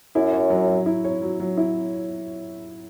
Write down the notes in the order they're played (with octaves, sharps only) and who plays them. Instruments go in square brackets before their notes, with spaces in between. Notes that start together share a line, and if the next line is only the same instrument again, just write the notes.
[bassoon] F#2 [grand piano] E4
[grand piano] C#5
F#3
F#3
E4
C#5
F#3
F#3
E4